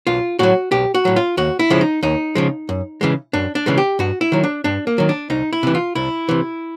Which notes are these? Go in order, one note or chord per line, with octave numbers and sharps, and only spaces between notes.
B1 F4
A2 F#3 F#4
B1 G4
F#4
A2 F#3
F4
D#2 F#4
E4
C#3 F3 G#3
D#4
D#2 D#4
C#3 F3 G#3
F#2
C#3 E3 G#3
F#2 D4
D4
C#3 E3 G#3
G4
G2 F#4
E4
D#3 F#3
D4
G2 D4
A#3
D#3 F#3
D4
C2 D#4
E4
C3 E3
F4
C2 E4
C3 E3